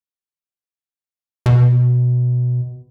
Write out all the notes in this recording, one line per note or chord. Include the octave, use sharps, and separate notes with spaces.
B2